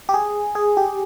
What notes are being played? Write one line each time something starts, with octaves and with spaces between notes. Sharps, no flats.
G4
G#4
G#4
G4